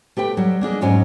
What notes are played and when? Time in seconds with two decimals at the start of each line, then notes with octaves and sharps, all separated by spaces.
0.17 A3 G4 B4 G5
0.37 F#3 G3
0.61 A#3 D4 G#4 D#5
0.81 F2 G#2 F#3 C#4 G#5